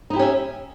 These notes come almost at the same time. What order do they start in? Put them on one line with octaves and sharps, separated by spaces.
D#4 E4 G4 C#4 E5